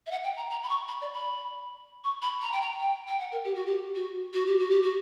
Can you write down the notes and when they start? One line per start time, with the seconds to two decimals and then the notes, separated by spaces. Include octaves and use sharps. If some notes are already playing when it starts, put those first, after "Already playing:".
0.07 E5
0.11 F#5
0.24 G5
0.37 A#5
0.50 A#5
0.63 B5
0.69 C#6
0.88 B5
1.01 D5
1.14 B5
2.04 C#6
2.22 B5
2.42 A#5
2.52 G5
2.62 A#5
2.80 G5
3.08 G5
3.20 F#5
3.32 A#4
3.44 G4
3.55 F#4
3.67 G4
3.96 F#4
4.34 F#4
4.46 G4
4.59 F#4
4.70 G4
4.82 F#4